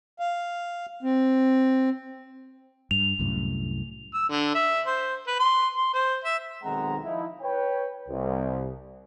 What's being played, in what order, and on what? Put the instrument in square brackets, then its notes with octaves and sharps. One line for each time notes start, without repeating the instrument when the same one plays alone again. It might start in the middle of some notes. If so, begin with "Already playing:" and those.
[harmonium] F5
C4
[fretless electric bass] G2 [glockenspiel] F7
[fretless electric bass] C2 F#2 A2
[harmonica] E6
D3
E5
C5
B4
C6
C6
C5
E5
[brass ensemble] B1 D#3 G#3 C4 F#5 A#5
F3 D#4 E4
B4 C#5 G5
C2